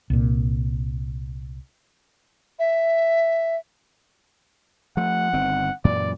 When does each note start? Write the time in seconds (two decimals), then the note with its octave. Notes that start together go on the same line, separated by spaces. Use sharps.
0.10 C2 A#2
2.59 E5
4.97 F3 A3 F#5
5.33 G1 D#3 C4
5.85 F#2 A#2 E3 D5